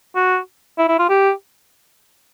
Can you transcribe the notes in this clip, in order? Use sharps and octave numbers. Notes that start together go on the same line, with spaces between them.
F#4
E4
E4
F4
G4